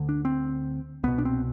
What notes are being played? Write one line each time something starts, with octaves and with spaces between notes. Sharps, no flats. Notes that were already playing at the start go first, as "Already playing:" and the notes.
Already playing: D2 D3
D4
C4
C2 B2 B3
D4
C4